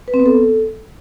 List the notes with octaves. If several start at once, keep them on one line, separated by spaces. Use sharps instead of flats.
B4
C4
B3
A4